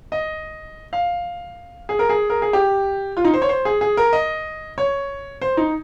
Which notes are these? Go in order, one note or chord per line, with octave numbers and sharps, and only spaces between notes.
D#5
F5
G#4
A#4
G#4
A#4
G#4
G4
F4
D#4
C5
C#5
C5
G#4
G#4
A#4
D#5
C#5
C5
D#4